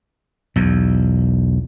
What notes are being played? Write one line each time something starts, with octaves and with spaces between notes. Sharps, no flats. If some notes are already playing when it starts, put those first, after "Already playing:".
B1 E2